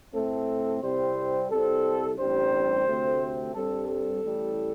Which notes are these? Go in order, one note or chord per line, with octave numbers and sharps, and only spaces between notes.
A2 A3 C4 A4
C2 C3 G3 C4 C5
C2 C3 G3 C4 A4
A1 G2 G3 C4 C5
D2 C3 A3 C4
G2 G3 C4 A4
A4
A1 A2 G3